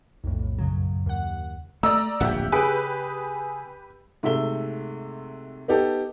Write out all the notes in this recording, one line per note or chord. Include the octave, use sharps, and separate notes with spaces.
B1 F2 A2
F#2 C#3 F#3
D#2 F#5
A3 D5 D#5 A#5 E6
D1 A#1 F2 G4 E5 F#5
C#3 G4 G#4 B4
G#2 C3 A3 E5 G7
B3 D#4 G4 A4